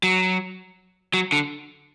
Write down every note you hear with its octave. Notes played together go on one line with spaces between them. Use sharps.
F#3
F#3
D3